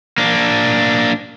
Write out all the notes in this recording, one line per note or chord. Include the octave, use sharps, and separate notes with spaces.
A#3 D4